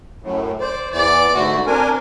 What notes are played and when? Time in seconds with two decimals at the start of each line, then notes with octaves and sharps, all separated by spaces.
0.23 F#2 A2
0.60 C5 D5
0.92 E2 E3 D5
1.35 G#2 D3 A3 F#4
1.67 C4 D4 A#4 G#5